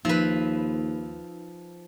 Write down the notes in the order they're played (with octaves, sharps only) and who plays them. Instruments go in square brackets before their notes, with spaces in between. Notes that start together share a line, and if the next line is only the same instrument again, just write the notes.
[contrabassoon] D#2 [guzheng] F3 B4 [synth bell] D#4